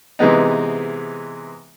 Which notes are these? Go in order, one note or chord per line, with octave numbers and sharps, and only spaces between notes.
C3 E3 G#3 B3 D#4